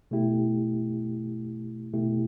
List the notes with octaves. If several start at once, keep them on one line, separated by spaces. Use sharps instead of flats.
B2 A3 E4 G4
B2 A3 E4 G4